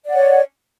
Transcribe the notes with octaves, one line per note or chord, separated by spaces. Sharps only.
C#5 D5 F#5